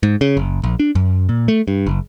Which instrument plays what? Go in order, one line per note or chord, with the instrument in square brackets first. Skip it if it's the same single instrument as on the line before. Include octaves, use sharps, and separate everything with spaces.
[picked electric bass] G#2
C#3
F#1
A#1
D4
F#2
A#2
A3
G2
F#1